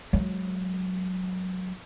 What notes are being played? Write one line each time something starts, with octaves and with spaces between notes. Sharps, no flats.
F#3 G#3